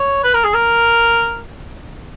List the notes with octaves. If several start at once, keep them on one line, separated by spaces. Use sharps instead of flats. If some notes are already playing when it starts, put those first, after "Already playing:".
Already playing: C#5
B4
A#4
G#4
A#4